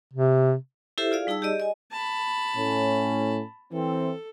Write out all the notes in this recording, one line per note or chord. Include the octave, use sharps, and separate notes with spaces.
C3
E4 G4 A4 C5 E5
F4 G#4 D5 F5
G3 D#4 G#4 A5 E6
G4 G#4 D5 D#5
D#5 G#5
A5 B5
A2 C#4
E3 C4 A4